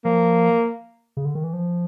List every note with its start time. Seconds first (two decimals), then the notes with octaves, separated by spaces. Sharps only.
0.05 F3 A#3
1.17 C#3
1.25 D3
1.35 D#3
1.44 E3
1.53 F3